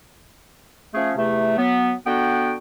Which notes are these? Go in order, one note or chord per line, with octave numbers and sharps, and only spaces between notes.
F3 A3 C#4 G#4
E2 C3 A3
F#3 B3
D3 B3 F#4 G5